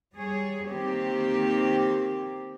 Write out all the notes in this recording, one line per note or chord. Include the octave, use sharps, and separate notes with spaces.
G3 G#4 C#5
D#3 A#3 C4 G4